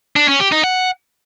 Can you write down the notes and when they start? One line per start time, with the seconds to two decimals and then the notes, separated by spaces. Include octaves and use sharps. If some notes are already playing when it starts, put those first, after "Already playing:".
0.16 D4
0.28 C#4
0.40 G4
0.52 D#4
0.64 F#5